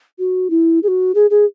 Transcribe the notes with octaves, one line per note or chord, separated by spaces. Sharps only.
F#4
E4
G#4
F#4
G#4
G#4